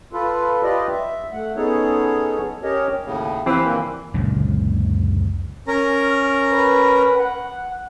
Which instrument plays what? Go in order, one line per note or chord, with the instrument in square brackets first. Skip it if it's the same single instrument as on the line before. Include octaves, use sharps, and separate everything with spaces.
[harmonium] F4 A4 B4
F4 G4 B4 D5 D#5
E5
A3 F#5
B3 C#4 D#4 G#4 A4 C#5
C#4 G4 A#4 C#5 D#5
[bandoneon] D#2 A2 C#3
[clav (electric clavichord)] E3 [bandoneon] A#3 G4 B4 [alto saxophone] C4
[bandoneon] G2 A#2 [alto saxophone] A#3
[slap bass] F#1 C#2 A#2 D3
[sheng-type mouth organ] C#4 A#4 A#5
[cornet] B4
F#5